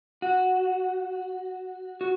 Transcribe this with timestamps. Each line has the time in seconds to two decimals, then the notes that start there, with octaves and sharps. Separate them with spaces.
0.22 F#4
2.01 F#4